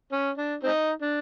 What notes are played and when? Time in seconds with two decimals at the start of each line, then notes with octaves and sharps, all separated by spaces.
0.12 C#4
0.37 D4
0.63 C4 D#4
1.01 D4